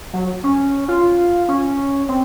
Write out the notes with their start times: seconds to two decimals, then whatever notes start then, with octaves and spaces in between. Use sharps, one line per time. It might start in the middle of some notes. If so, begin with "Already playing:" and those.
0.13 F#3
0.44 C#4
0.88 F4
1.48 C#4
2.09 C4